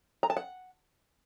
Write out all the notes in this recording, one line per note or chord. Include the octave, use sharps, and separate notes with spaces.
A#5
A5
F#5